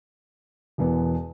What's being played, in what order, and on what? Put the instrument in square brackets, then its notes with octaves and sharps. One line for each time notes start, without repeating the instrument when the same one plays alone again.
[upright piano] E1 E2 E3 B3